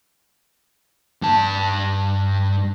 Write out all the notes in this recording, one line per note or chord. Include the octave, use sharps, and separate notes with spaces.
G2 A5